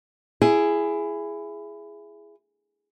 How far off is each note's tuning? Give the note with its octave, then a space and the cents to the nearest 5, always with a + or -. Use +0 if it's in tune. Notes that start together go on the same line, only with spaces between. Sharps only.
E4 +20 G#4 +0